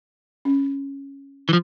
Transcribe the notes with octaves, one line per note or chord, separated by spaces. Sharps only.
C#4
E3 F3